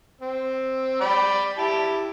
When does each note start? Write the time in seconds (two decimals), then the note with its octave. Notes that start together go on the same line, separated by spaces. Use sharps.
0.21 C4
1.01 D5 G5 B5
1.58 E4 G4 A5